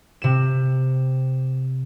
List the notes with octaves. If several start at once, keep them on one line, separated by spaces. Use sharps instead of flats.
C3 E7